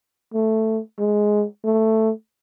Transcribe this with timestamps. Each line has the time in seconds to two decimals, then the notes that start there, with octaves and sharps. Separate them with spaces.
0.34 A3
0.99 G#3
1.65 A3